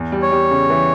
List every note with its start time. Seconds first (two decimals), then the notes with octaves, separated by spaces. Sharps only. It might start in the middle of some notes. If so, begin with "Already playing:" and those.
Already playing: E2
0.12 G3
0.22 C#5
0.32 G3
0.51 C#3
0.70 E3